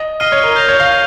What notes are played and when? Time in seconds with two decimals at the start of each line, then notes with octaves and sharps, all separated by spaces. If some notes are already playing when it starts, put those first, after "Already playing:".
Already playing: D#5
0.20 D#5 F6 C7 D#7 G7
0.32 C#5
0.44 A#4
0.56 G6 A#6 F7
0.68 C#5
0.80 F5
0.92 F7